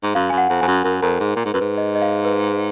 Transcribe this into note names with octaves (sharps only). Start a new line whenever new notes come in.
G#2
F#2 F5
F#2 G#5
F#5
F2
F2 G#5
F#2
F#2 A#4
F2 A#4
G#2
A#2
G#2
F#2 B4
G#2
D#5
D#5
F5
B4